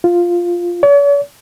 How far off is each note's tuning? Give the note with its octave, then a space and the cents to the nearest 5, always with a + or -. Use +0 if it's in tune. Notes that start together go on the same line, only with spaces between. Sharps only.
F4 +0
C#5 +45